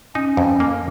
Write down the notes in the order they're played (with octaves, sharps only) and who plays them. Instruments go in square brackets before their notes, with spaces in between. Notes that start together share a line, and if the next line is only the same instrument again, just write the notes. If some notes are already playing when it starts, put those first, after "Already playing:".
[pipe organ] C#4 [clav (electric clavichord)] D#4
[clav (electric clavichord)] F2
A#3